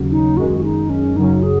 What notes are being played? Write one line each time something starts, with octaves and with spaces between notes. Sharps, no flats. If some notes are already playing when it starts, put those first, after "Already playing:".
Already playing: D#2 C#3 F#3 C#4
D#4
F#2 D#3 G#3 F#4
F#4
D#4
C#4
F#2 C#3 F#3 C#4 D#4
G#4